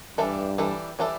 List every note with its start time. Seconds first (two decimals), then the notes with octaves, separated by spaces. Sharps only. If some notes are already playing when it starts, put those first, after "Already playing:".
0.18 G2 E3 G3 D4 A4 E5
0.58 E3 G3 D4 A4 E5
0.99 E3 G3 D4 A4 E5